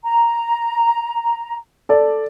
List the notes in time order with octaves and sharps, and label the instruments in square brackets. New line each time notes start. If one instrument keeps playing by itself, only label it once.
[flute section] A#5
[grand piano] A4 D5